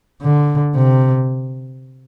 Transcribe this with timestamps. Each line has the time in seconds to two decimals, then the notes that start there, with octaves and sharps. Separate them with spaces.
0.22 D3
0.75 C3